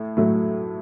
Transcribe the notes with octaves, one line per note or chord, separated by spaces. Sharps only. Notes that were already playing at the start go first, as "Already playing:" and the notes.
Already playing: A2
A2 F#3 A3